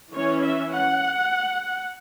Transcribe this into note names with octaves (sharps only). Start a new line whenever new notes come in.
E3 C#4 C#5
E5
F#5